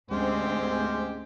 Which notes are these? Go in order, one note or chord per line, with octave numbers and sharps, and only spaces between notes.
D2 G#2 G#3 C4 C#4 G4 C5